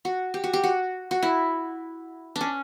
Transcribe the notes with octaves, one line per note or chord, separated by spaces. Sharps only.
F#4
G4
F#4
G4
F#4
F#4
E4
D4
C#4